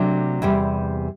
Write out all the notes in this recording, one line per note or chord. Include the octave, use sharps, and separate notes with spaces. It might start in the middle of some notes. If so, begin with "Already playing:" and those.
Already playing: C3 F#3 A3 D4
E2 C3 G3